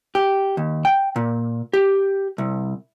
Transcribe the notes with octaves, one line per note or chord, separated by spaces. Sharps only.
G4
D#2
G5
A#2
G4
C2